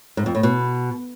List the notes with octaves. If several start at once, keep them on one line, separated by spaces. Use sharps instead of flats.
G#2
F2
A2
B2